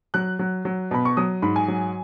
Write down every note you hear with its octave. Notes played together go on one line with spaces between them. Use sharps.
F#3 F#6
F#3
F#3
B2 B5
C#6
F#3 D#6
G#2 B5
G#5
F#3